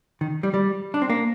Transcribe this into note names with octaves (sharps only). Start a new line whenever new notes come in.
D#3
G3
G3
D4
C4
A#3